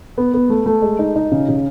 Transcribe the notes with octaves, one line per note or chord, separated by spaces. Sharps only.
B3
B3
A3
A3
G#3
D#4
D#4
C#3
C#3